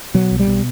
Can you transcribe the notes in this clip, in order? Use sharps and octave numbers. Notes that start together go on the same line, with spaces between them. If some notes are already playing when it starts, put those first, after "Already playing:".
B2 F#3
B1
G3
B2